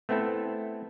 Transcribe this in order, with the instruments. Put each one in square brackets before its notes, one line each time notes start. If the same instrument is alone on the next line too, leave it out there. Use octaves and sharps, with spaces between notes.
[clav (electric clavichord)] A3 B3 C4 E4 A4